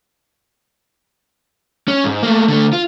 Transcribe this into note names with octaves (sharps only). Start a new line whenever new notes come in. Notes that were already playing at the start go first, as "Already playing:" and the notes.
C#4
G#2
A3 A#3
D3 A3
F4